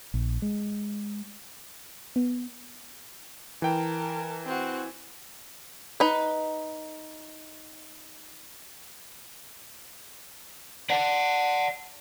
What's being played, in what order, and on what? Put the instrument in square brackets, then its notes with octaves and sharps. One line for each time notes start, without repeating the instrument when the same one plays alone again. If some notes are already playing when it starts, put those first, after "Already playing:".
[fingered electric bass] A#1
G#3
[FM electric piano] B3
[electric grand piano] E3 G5 [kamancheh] A#4 A5
[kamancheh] C4 F#4
[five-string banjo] D#4 B4
[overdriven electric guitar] D5 F#5